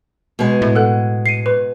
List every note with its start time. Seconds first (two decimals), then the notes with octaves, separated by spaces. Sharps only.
0.39 B2 G#3
0.62 A2
0.75 A4 F#5 F#6
1.26 C7 C#7 D#7
1.46 B4